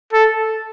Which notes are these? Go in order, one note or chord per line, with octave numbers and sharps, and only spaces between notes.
A4